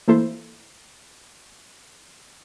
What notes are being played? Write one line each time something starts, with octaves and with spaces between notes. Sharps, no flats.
E3 A3 A#3 E4 A4 C5